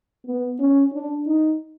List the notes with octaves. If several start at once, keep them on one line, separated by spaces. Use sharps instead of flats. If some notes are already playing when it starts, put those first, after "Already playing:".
B3
C#4
D4
D#4